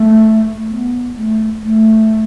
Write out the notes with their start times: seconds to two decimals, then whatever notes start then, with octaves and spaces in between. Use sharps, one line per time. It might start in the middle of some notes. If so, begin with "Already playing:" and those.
Already playing: A3
0.70 B3
1.16 A3
1.62 A3